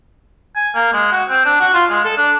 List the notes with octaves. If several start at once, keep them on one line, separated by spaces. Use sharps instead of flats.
G#5
A#3
G#3
F#4
C4
D4
F#4
F4
G#3
A4
D4